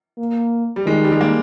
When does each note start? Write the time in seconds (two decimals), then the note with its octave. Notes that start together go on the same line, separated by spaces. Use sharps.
0.18 A#3
0.76 G3
0.86 D#3 G#3
1.04 G3
1.12 G#3
1.21 A#3